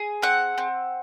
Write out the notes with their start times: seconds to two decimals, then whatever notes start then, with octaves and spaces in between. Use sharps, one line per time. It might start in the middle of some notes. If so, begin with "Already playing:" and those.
Already playing: G#4
0.23 C4 F#5
0.58 C4